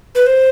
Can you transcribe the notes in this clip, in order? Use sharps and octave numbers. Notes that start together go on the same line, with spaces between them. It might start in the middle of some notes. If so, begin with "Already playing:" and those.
B4
C5